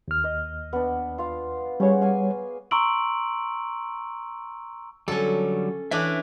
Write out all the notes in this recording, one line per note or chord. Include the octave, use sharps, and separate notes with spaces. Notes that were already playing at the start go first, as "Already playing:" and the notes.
D#2 F6
D#5
B3 D4
F4 F5
G3 C#4 G#4 C#5 F#5
D5 F5 G#5
A#5 C6 C#6 E6 D7 F#7
D3 F#3 G3 C#4 A4
E3 C#4 D4 E5 D6